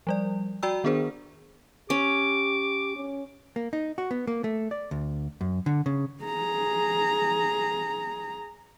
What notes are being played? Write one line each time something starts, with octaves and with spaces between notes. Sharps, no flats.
F3 G3 D5
F#4 D5 G5 A#5 E6
D#3 B3 D4 G#4 A#4 C5
C#4 G4 D6
C#4
A#3
D#4
F#4
B3
A#3
A3
D5
D2
F#2
D3
C#3
G#4 A#5